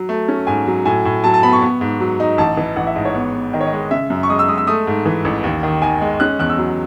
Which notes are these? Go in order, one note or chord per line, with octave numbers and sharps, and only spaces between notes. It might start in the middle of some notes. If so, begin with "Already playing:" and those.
Already playing: F#3
A3
C#4
G#2 G#5
F#3
A2 G#5
A2
F#3 A5
A5
B3 B5
C#6
B3
G#2
F#3
D#4
A1 A5
E3
A1 F#5
E5
G#2 D#5
C#5
B3
B3
D#3 D#5
C#5
D#5
G#3
C#3 E5
F#2
C#6
G#3 D#6
E6
G#3 D#6
E6
A3 D#6
G#2
E3
A1
D#2
D#3
D#3 G#5
G#3
C#4 F#6
E2 F#6
E6
F#3